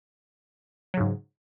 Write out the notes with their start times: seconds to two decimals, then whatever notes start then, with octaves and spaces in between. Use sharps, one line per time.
0.94 F#3
0.97 C#3
1.00 G#2